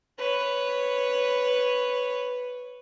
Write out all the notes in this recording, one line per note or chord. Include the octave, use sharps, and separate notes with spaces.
B4 C#5